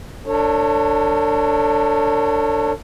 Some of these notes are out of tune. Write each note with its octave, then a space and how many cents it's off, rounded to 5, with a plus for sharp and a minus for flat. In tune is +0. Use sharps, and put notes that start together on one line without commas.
D4 +0 A4 +40 C#5 -15